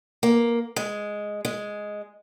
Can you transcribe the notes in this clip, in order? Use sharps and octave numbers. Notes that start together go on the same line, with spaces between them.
A#3
G#3
G#3